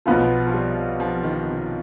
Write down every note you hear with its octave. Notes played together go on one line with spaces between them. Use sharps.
B1 B2 F3 B3 F4
F3
G3
F3
D#3
C3